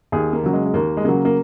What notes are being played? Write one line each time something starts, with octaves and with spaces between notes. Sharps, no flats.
D#2 G#4
A#3
C#3 F#3
G#3
G#3
D#2 A#3
G#3
C#3 F#3 A#3
A#3